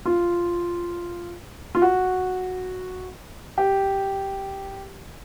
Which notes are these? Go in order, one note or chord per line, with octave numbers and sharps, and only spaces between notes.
F4
F4
F#4
G4